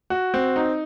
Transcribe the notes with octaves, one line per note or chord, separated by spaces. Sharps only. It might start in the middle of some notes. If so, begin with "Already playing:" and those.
F#4
C4
D#4